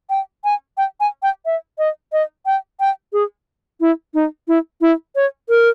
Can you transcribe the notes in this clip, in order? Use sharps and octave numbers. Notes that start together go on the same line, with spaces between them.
G5
G#5
G5
G#5
G5
E5
D#5
D#5
G5
G5
G#4
E4
D#4
E4
E4
C#5
A#4